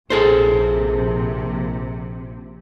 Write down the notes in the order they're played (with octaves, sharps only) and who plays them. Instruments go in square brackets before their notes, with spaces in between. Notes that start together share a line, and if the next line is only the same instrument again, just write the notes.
[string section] A#1 C3 [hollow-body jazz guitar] G#4 A4 C5